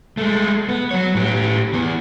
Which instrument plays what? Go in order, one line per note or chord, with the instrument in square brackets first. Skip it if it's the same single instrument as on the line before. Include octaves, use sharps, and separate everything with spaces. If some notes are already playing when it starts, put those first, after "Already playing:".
[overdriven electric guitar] G#3 A3
B3
F#3 C#5
A2 G4
E3 B3